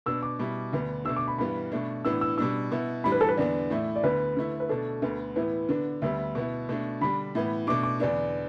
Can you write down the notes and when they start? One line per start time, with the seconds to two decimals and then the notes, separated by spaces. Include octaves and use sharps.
0.06 B2 B3 D4 E6
0.23 D6
0.39 B2 G3 E4
0.73 D2 D3 B3 D4
1.05 B2 A3 D4 E6
1.17 D6
1.28 B5
1.38 G2 E3 G3 B3 B5
1.72 B2 A3 D4
2.05 A2 E3 B3 D4 E6
2.21 E6
2.38 B2 G3 D4 E6
2.72 B2 B3 E4
3.04 A2 E3 G3 D4 B5
3.12 B4
3.21 A4
3.28 B4
3.37 E2 D3 B3 D4 D5
3.71 A2 E3 A3 E4
3.96 D5
4.03 D2 D3 B3 B4
4.37 D3 A3 E4
4.60 B4
4.69 B2 A3 D4 A4
5.02 D2 D3 B3
5.36 A2 E3 B3 E4 B4
5.69 D3 B3 D4
6.02 D2 D3 G3 B3 E5
6.35 B2 B3 E4
6.69 B2 A3 D4
7.01 D3 G3 D4 B5
7.35 A2 E3 B3
7.67 B2 A3 D4 D6
7.83 D6
8.00 E2 D3 B3 D4 D5